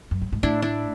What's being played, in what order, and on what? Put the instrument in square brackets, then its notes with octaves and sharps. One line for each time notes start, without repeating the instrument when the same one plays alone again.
[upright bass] F#2
G2
G#2
[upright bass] A2 [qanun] D4 E4
[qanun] D4 E4